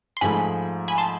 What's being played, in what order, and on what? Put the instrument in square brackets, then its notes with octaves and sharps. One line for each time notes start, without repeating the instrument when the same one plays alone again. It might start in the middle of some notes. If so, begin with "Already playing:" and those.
[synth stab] C6
[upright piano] G#2 F3 A3 [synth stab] G#5 B5
[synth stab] G#5 B5
A5 C6